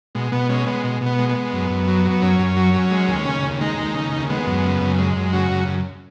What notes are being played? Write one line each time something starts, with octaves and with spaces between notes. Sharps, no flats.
B2 G#3
B2 B3
G#3 C#4
G#3 B3
B2
B2
B3
G#3
B3
G#3
F#2
F#2
F#3
F#3
B3
F#2 C#4
F#2
F#3
F#3
G#3
D#2
C#3
D#2
G#3 D#4
D#2
C#3
D#2
G#3 B3
F#2
C#3
F#2
G#3
F#2
C#3 F#4
F#2
F#2